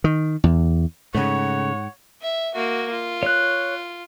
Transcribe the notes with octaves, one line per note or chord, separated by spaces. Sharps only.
D#3
E2
G#2 C#3 A3 C#5 F#5
E5
A#3 F#4
F4
C#5 F#6